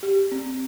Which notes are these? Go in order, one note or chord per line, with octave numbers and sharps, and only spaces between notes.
G4
C4